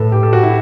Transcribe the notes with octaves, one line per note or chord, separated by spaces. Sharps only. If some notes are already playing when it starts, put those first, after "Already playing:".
Already playing: A2 A4 B4
G4
A4
F#4
E4